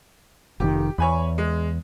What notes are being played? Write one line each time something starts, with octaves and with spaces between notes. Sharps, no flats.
F1 A2 D#3 G4
E2 C#5 G#5 B5
G#3